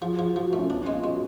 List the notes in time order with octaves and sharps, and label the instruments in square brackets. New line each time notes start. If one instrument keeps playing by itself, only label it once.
[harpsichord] F3 [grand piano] G#4
[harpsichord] F3
[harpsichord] F3 [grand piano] F#4
[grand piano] F4
[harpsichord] A3
[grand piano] C#4
[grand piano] B3 [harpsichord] D4
[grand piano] C#4
[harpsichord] G#3
[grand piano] F4
[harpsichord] G#3 [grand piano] F#4